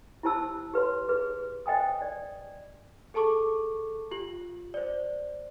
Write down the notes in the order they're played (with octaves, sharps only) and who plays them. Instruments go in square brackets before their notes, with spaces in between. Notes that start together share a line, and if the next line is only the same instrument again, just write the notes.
[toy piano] E4 G4 C5 A5 E6
G4 B4 C#5 C6
G#4 B4
C5 D#5 G5 G#5 D#6
D5
[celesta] G#4 A4 A5 C#6 D6
F4 G4 F#7
C5 D5